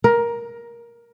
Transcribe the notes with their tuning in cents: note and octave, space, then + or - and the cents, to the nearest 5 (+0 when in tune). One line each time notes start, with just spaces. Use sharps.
A#4 +15